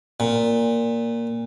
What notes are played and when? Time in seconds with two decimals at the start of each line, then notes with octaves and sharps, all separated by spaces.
0.20 A#2